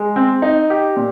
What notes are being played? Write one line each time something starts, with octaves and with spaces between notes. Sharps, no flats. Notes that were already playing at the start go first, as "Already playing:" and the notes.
Already playing: G#3
C4
D#4
G4
A#2